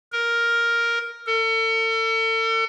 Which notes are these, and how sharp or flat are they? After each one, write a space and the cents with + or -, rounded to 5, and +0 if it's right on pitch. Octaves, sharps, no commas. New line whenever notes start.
A#4 +5
A4 +40